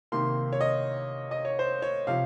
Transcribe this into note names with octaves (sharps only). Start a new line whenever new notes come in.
C3 D#3 A#3 C6
C#5
D#5
D#5
C#5
C5
C#5
C3 F3 F5